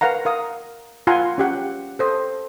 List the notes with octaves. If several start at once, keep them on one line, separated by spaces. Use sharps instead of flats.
A#4 B4 F5 F#5 A#5
A#4 F5 D#6
F4 F5 F#5 G#5 A#5 C6
C#4 G4 F#5
A4 C5 D#6